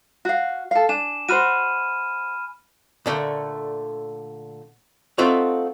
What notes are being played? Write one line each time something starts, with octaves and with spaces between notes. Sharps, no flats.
F#4 F5
A4 F5
D4 G#5 E7
F#4 C5 B5 F6 D#7
A#2 D3 A3
A3 C4 D#4 F4 F#4